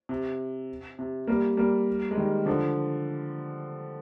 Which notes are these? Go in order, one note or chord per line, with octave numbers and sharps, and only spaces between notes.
C3
C3
G3 A#3
G3 A#3
G#3
D#3 G3
D3 F3